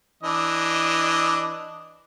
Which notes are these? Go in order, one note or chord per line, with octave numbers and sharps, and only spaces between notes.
E3 D4 D#5